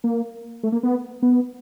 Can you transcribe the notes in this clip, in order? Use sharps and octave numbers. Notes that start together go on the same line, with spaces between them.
A#3
A3
A#3
B3
B3